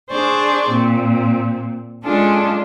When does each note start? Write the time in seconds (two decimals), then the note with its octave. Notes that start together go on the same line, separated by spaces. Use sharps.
0.11 D4 G#4 C5 D5 C#6
0.70 A#2 C4
2.03 G#3 C#4 D4 F4 G#4 A4